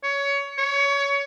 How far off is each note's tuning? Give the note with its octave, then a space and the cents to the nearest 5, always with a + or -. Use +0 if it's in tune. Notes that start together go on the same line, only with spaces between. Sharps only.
C#5 +20
C#5 +20